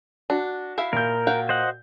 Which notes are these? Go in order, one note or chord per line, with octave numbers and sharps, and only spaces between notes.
D4 F#4
E4 E5 F5
A#2 A#4 G6
F#4 F5 G5
C5 D#5 F#5